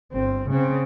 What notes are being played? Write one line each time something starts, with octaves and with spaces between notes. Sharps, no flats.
G1 C4
C#3 C4